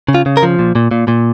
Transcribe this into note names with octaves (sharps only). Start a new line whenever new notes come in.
C#3
F4
C#3
A#4
F3
A#2
A#2
A#2
A#2